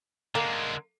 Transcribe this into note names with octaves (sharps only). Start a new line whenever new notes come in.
D3 G#3 A#3